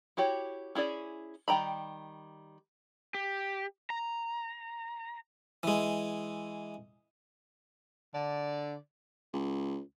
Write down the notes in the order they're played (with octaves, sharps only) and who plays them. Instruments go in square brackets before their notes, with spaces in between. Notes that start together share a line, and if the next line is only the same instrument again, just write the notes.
[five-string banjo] E4 F#4 G4 C#5
C#4 E4 G#4 D5
D#3 G3 G5 A#5 B5
[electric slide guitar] G4
A#5
[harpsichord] E3 G#3
[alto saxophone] D3 [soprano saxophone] D5
[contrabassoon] C#2